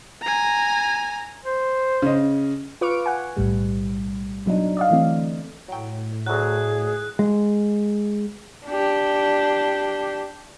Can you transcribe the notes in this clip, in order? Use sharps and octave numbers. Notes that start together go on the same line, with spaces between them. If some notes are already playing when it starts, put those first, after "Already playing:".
G#5 A#5
C5
C#3 D#5
F4 B4 C#6 D6 F6 D7
F#5 G#5
B1 A2 G3
B2 F#3 D4 D#4
D5 D#5 F5
D3 E3 A3 C4
A2 F#3 G5
D2 F#3 G#4 F#6
G#3
D4 G4